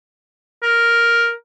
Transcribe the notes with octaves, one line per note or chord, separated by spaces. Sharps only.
A#4